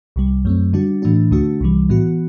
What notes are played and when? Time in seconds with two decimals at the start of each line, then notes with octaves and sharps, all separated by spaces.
0.16 C2 C3 G3
0.45 F#2 F#3 A3 C4
0.73 D3 G3 D4 F#4
1.02 A2 E3 A3 D4 F#4
1.31 D2 D3 A3 D4 F#4
1.61 C2 C3 E3 G3
1.89 A2 E3 B3 F#4